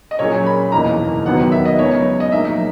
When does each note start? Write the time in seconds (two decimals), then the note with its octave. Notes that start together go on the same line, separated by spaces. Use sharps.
0.11 D#5
0.19 A#2 F#3 C#4 G#4 C#5
0.46 B5
0.72 F#1 E2 B2 A#3 D#4 A#5
1.26 D#2 D#3 F#3 B3 F#4 F#5
1.52 E5
1.65 D#5
1.79 C#2 C#3 F#3 B3 D#4 C#5
2.20 D#5
2.32 A#1 G#2 F#3 A#3 E5